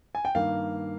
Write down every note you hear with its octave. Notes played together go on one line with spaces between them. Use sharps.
G#5
G5
G2 D#3 A#3 F5